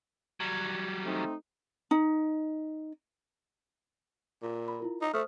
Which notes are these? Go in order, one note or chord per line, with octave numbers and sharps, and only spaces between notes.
F#3 G3
A3 C4 D#4
D#4
A#2
B5
E4 F4 A#4
D#4
A3 C5 D#6 F6